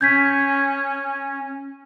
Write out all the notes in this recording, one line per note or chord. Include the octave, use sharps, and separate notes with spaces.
C#4 G6 G#6 B6